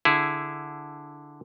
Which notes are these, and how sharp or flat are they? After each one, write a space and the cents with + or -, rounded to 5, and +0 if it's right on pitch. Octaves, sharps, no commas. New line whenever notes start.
D3 +0 E4 +0 G#4 +0